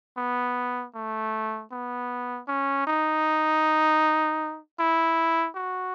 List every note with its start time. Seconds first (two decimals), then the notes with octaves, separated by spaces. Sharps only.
0.17 B3
0.95 A3
1.72 B3
2.48 C#4
2.87 D#4
4.79 E4
5.55 F#4